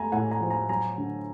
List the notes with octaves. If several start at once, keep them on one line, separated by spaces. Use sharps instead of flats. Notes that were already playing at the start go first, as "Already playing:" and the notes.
Already playing: A3 G#5 A#5 B5
A2 F#5 G#5
G#5 A#5
F3
G#5 A#5
F#3 G#5 A#5
D3